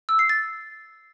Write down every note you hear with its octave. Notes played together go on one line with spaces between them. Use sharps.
E6
C7
A6